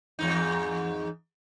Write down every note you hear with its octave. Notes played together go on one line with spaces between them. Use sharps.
E2 G#2 D#4